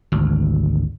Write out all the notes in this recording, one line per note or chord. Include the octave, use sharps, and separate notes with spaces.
G#1 D2